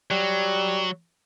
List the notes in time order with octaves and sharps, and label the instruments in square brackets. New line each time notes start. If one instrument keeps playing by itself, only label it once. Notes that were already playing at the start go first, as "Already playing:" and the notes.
[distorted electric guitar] F#3 [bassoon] G3